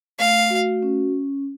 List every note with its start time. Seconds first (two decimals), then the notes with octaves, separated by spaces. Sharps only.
0.19 A3 F5
0.50 F#4
0.83 C#4